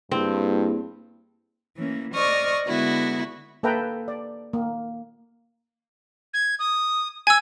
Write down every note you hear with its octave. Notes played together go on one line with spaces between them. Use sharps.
G2 A#3 C4 E4 G#4
E3 A#3 C#4
C5 D5 D#5 C#6 D#6 F6
D3 G#3 B3 E4 F#4
A#3 A4 B4 E5 G5 A#5
D5
A#3
G#6
D#6
G#5 E6 G#6